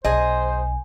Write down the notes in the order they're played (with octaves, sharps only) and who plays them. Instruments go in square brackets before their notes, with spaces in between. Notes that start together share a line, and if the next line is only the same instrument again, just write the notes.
[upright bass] B1 [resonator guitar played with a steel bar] G#4 D#5 [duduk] C5 [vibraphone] G#5